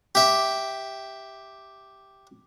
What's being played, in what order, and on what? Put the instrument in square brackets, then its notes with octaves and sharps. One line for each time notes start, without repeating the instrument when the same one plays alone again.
[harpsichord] G4 E5